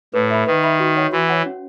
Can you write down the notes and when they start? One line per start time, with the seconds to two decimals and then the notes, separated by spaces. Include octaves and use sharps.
0.14 A2 B4
0.30 E5 B5
0.47 D#3 B4
0.64 E5 B5
0.80 F#4
0.97 C#5 F#5
1.13 E3 F#4
1.29 C#5 F#5
1.46 C#4